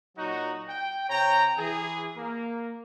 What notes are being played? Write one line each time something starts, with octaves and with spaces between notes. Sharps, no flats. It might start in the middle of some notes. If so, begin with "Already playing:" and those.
A#2 F#3 D#4 F#4
G5
C3 C#5 G5 A#5
E3 G#4
A#3